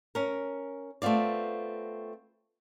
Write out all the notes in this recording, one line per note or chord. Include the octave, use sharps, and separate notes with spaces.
C#4 A#4
A3 B3 C4 F4 D5